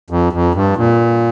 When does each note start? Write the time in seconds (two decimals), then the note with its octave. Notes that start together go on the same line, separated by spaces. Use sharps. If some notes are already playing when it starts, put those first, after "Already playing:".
0.10 F2
0.33 F2
0.55 G2
0.77 A#2